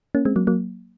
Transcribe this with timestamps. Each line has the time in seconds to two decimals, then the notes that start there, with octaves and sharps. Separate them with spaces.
0.15 A#3 C#4
0.25 G#3 C4
0.36 F#3 A#3
0.47 F#3 A#3